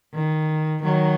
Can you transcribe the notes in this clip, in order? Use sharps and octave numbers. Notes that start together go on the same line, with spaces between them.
D#3
D#3 F#3